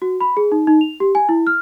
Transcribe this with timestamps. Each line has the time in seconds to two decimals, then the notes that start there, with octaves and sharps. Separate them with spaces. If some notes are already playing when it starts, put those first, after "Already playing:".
0.02 F#4
0.21 B5
0.37 G#4
0.52 D#4
0.67 D#4
0.81 F7
1.00 G4
1.15 G#5
1.29 E4
1.47 F6